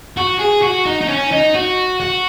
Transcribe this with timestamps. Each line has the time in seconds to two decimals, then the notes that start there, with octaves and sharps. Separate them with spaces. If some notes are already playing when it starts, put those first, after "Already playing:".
0.17 F#4
0.39 G#4
0.62 F#4
0.86 D#4
1.01 D#4
1.09 C#4
1.32 D#4
1.55 F#4
2.00 F#4